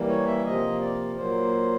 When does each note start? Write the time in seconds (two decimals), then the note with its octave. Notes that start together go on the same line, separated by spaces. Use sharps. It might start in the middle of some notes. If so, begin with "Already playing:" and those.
Already playing: E3 G3 A#3
0.08 C#5
0.26 E5
0.45 C3 F3 A#3 D#5
0.81 D5
1.15 A#2 F#3 A#3 C5